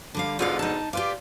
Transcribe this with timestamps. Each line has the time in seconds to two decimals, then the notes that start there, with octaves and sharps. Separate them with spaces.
0.15 D3 G3 F5
0.39 G#2 B2 D3 F4 D5 F5
0.59 D#4 A5
0.93 F4 G4 B4 D5